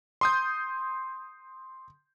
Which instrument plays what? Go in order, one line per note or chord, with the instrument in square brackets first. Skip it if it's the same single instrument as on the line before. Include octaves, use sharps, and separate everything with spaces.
[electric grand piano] C6 D#6 G6